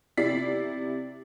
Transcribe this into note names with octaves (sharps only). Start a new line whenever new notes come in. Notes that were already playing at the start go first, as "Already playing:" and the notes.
C3 E4 D5 B6 C7